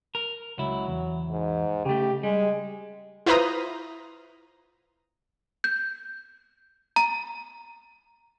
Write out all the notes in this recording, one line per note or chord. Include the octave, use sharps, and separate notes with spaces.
A#4
C#2 F#3 E4
E2
G#2
C#3 A3 G4
G3 G#3
E4 F4 B4 C5 A#5 D#6
G6
A#5